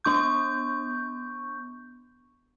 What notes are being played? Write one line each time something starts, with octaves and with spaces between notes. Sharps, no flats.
B3 D4 C#6 G6